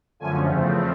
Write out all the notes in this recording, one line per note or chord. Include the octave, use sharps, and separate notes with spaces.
F#2 D3 F3 A3 C#4 G#5
E2 C#3 F3 A3 C4